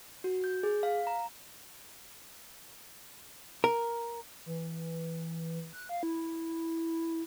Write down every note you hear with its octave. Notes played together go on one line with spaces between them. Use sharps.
F#4
G6
G#4
F5
A#5
A#4
E3
F#6
F5
E4